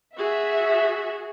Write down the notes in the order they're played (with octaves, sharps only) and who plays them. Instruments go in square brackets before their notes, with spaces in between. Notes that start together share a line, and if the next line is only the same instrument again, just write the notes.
[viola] F#4 G#4 [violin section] E5